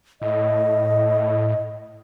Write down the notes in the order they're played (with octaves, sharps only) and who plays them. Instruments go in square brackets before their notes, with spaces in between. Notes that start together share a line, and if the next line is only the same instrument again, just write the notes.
[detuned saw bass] A2 [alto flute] D#5